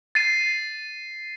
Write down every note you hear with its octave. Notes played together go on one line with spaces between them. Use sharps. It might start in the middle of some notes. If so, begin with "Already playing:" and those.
A6 C7 D#7